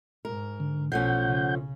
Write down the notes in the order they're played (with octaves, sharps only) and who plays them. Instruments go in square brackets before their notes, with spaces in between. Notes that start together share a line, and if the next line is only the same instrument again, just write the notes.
[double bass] G#2 [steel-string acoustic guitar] A#4
[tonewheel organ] D3
[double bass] B1 B2 [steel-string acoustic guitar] F3 A3 C#4 [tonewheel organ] F#5 G6
[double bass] C#3